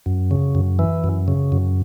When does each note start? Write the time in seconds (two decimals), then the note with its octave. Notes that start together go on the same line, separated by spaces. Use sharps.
0.06 F#2
0.31 C#3
0.55 F#2
0.79 E3
1.04 F#2
1.28 C#3
1.52 F#2